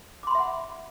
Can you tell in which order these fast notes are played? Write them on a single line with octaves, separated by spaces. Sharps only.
D6 C6 B5 E5 F#5